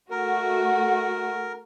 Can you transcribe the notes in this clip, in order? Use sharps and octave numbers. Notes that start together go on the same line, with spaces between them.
A3 F#4 A#4